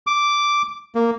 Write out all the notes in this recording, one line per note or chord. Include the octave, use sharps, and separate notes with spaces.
D6
A#3